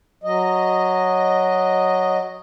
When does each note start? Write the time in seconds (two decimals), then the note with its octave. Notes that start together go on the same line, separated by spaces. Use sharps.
0.24 F#3 D#5